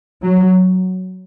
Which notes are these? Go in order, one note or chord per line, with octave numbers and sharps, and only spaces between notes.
F#3